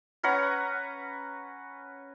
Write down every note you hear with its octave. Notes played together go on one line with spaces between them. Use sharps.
C#4 B4 F#5 A#5